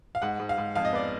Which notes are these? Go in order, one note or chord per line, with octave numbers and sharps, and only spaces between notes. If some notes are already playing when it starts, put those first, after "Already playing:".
F5
G#2 F#5
G#2
F5
G#2
F2 F5
D#5
B3 D5